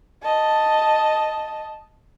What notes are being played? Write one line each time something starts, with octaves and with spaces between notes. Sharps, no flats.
D#5 A5